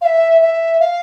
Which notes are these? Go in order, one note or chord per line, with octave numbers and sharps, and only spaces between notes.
F5
E5
E5
F5